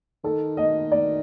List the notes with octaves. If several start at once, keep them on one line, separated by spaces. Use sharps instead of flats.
D#3 A4
D#5
D5